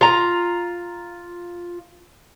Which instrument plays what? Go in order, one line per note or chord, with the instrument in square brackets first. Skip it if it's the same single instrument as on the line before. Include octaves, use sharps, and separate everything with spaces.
[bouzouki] F4 A#5